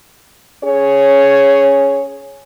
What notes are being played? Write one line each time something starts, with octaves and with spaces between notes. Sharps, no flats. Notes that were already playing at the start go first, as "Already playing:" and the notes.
C#4 G#4 C#5